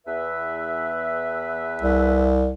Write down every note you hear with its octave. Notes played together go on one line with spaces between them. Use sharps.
E2 B4 E5
C2